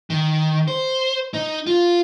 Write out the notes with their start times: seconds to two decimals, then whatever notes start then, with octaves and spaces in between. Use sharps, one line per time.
0.10 D#3
0.68 C5
1.34 D#4
1.67 F4